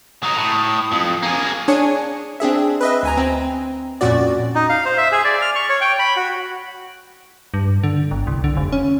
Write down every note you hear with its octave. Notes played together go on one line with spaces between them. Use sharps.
F#3 D#4 D#6
A2
F2
A#3 G#4
D4 G#4 C#5 G#5 C#7
C4 D4 G#4 E5
B4 D#5 E5
D2 G#5 A#5
C4
F2 A#2 C#4 F#4 D5
D#4
F5
C5
E5
G#4
D5
F6
C#6
C#5
G5
B5
F#4
G2
D3
G1
C2
D3
F1
C#4